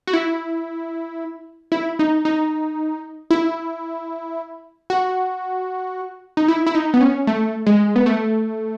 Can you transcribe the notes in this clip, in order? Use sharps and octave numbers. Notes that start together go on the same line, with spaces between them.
F#4
E4
E4
D#4
D#4
E4
F#4
D#4
E4
E4
D#4
B3
C#4
A3
G#3
B3
A3